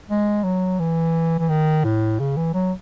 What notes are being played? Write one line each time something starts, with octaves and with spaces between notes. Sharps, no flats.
G#3
F#3
E3
E3
D#3
A2
C#3
E3
F#3